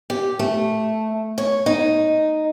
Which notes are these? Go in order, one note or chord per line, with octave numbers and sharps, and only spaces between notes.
G4
A3
C#5
D#4